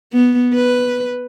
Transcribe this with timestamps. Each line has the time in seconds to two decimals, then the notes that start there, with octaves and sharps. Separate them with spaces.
0.13 B3
0.55 B4